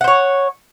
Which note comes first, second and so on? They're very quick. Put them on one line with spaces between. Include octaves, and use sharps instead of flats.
F#5 C5 C#5